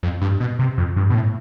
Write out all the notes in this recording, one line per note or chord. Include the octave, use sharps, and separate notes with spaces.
F2
G2
B2
C3
F2
G2
B2
A2